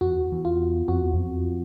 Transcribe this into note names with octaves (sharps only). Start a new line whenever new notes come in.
F2 F#4
E2
E2
F4
F2 F#4
E2
F2